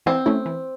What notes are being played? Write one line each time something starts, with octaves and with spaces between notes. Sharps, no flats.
E3 C4
A3 C#4 E4
E3